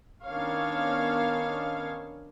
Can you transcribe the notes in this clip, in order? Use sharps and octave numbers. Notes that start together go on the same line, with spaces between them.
D#3 B3 C#4 D4 C#5 F5